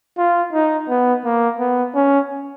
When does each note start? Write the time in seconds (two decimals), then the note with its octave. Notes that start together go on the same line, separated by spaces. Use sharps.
0.18 F4
0.53 D#4
0.89 B3
1.24 A#3
1.59 B3
1.95 C#4